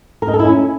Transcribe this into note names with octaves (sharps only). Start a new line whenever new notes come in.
A#4
D#4
A4
E4
C#4